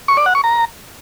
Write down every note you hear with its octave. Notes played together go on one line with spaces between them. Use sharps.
C#6
D5
F#5
C#6
A#5